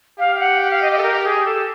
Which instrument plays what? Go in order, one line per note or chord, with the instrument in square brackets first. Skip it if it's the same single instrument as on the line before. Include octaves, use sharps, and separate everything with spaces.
[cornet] G4 [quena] F5
[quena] F5
F#5
F#5
F5
D#5
D#5
A4
A#4
G#4
A4